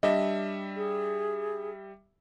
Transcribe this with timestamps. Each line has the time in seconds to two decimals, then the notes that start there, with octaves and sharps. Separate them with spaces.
0.03 G3 D4 D#5 E5
0.76 G#4